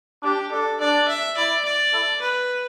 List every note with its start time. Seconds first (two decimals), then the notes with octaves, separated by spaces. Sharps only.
0.23 D4 G4
0.51 D4 A4
0.80 D4 D5
1.08 E5
1.37 E4 D5
1.65 D5
1.92 E4 A4
2.21 B4